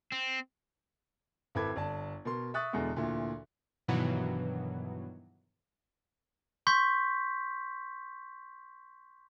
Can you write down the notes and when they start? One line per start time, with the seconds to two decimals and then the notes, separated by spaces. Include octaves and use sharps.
0.12 C4
1.55 G#1 E4 A4 B4 D6 G#6
1.76 G1 D5 A5
2.25 B2 A#4 C6
2.54 E5 C#6 D#6 F#6 A6
2.73 E2 B2 D3 G#3 B3
2.96 D2 A#2 E3
3.88 G2 B2 D#3 E3 F#3 B3
6.67 C6 C#6 G6 B6